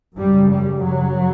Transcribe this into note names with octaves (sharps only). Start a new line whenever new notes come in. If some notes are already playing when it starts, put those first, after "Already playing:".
F#2 C#3 G3
G3
F#2 C#3 F#3